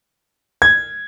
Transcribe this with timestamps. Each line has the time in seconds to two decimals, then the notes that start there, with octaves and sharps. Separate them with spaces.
0.62 G#6